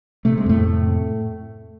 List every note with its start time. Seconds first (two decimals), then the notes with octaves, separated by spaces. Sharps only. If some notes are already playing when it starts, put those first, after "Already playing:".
0.25 C3 A3
0.38 G#3
0.46 F2 A2 A3
0.66 C3